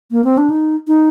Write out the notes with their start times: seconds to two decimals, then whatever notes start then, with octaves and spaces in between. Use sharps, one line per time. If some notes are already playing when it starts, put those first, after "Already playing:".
0.11 A#3
0.24 C4
0.38 D4
0.50 D#4
0.88 D#4